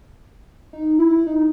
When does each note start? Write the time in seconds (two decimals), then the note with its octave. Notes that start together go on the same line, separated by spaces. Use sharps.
0.73 D#4
0.99 E4
1.27 D#4